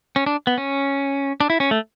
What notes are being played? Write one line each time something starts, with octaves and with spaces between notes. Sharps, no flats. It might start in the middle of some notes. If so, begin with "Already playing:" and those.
C#4
D4
B3
C#4
D4
E4
C#4
A3